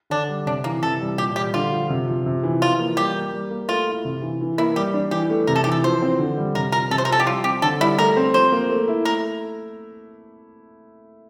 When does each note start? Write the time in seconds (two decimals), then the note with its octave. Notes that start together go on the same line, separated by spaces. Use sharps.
0.10 D3 D4
0.29 G3
0.46 C3 D4
0.64 E3 A#3
0.82 C3 A4
1.00 G3
1.18 A#2 G4
1.35 G3 G4
1.54 D3 F4
1.72 F3
1.90 C3
2.07 F3
2.26 C3
2.43 E3
2.61 F3 F4
2.79 A#3
2.97 G3 G4
3.15 A#3
3.33 G3
3.51 A#3
3.69 A3 F4
3.87 E4
4.05 C3
4.22 E3
4.41 E3
4.58 A#3 E4
4.76 G3 G4
4.94 D4
5.11 E3 G4
5.30 A3
5.47 C3 A#4
5.56 A4
5.64 E3 G4
5.72 A4
5.83 F3 C5
6.02 C4
6.19 D3
6.37 G3
6.55 C3 A#4
6.72 F3 A#4
6.91 C3 A4
6.98 C5
7.05 A#4
7.09 F3 A4
7.20 G4
7.27 G3 F4
7.44 C4 G4
7.62 D3 A4
7.80 G3 E4
7.98 A3 A#4
8.17 C4
8.34 F3 C5
8.52 A#3
8.69 A3
8.88 E4
9.05 A3 A#4